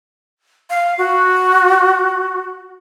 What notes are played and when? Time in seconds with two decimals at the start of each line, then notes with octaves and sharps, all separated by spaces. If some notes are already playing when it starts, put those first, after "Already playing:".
0.70 F5
0.98 F#4